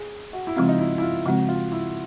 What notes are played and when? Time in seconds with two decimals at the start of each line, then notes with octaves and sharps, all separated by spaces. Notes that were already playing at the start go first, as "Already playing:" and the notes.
Already playing: G#4
0.33 F#4
0.47 E4
0.56 C#3 F3 G#3 C4 F4
0.68 D#4
0.79 E4
0.98 E4
1.02 F4
1.26 C#3 F3 G#3 C4 F#4
1.49 F4
1.72 E4